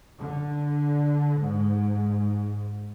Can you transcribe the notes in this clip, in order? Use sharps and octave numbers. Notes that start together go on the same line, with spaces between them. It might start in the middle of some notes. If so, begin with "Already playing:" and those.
D3
G#2